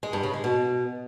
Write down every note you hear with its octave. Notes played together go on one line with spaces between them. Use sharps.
G#3
G2
C#3
G#3
B2